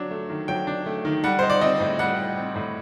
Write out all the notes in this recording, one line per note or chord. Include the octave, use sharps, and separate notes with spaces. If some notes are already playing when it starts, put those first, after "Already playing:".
Already playing: F#3 D4
A3
D#3
F#3 G5
D4
A3
D#3
G3 F#5
D#4 C5
D5
C4 D#5
A2
G3 F#5
D#4
C4
A2